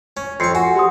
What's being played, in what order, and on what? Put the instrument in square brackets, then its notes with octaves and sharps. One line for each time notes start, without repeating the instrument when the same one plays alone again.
[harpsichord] C#4
[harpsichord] F2 C#6 [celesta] C6 C7 C#7
[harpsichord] F#4 [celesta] G#5
[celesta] G4 C6 D#6